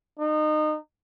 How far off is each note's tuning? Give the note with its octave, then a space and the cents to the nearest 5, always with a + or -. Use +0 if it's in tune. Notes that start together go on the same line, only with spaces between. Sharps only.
D#4 -25